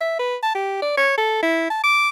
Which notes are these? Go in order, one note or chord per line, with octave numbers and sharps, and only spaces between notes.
E5
B4
A5
G4
D5
C#5
A4
E4
A5
D6